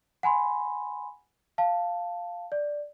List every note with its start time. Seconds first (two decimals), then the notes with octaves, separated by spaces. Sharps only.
0.23 F#5 G#5 B5 C6
1.58 F5 A5
2.52 D5